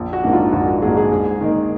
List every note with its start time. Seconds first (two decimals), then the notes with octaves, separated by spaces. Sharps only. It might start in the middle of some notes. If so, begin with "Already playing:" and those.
Already playing: A#1
0.13 F#4
0.23 G#2 D#3 A#3 D4
0.33 F4
0.53 A#1 F#4
0.67 F#4
0.82 G#2 D#3 A#3 D4 G#4
0.97 G#4
1.11 G#2
1.41 D#3 A#3 D#4